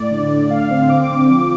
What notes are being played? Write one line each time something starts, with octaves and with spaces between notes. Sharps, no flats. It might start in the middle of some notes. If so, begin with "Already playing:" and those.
Already playing: A2 D5
D3
D3
A2 F5
C4
C4 D6
D3
F3